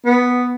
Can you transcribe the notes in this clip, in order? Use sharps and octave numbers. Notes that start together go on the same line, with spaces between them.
B3